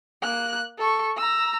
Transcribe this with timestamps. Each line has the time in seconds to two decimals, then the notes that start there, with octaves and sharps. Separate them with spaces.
0.23 A#3 F#6
0.78 A4 C#6
1.17 A#5 E6